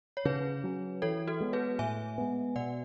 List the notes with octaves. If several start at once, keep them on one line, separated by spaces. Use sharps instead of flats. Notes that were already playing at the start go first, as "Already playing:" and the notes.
C#5
C#3 G#4 B4
F#3 C#4
E3 A4 C#5
F#4 A4
G#3 B3
G#4 B4
A2 E5 G#5
G#3 B3
B2 D5 F#5